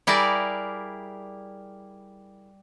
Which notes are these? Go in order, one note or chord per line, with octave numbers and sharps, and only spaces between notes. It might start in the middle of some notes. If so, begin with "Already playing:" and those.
G3 E4 G#4 A#4 D5